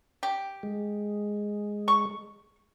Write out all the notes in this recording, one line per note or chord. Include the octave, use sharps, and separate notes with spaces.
G4
G#3
C#6